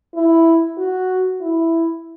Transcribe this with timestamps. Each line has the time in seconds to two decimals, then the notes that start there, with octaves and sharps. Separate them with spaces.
0.15 E4
0.78 F#4
1.41 E4